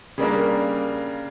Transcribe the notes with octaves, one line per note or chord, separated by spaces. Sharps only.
C#3 G3 A#3 D4 A#4